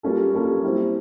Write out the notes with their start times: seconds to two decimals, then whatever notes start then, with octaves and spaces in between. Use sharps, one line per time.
0.03 G3 A#3 C#4 F4 A4
0.33 G3 A#3 C#4 F4 A4
0.63 G3 C4 E4